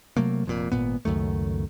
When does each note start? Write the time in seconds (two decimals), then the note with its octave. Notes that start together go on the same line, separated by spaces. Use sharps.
0.17 C3 F#3 A3 A#3
0.46 F1 F2 A#2
0.72 G#1 G2 A#2 B3
1.05 C#2 F#2 D#3 A3